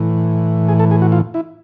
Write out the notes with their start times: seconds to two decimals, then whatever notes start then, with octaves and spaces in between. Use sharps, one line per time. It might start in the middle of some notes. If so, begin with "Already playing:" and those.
Already playing: A2 E3
0.69 G#4
0.80 A4
0.91 G#4
1.02 F#4
1.12 F4
1.34 E4